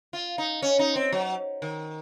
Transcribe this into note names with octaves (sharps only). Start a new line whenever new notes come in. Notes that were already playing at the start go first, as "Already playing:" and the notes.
F4
D#4
C#4
D#4
C4
F#3
D#3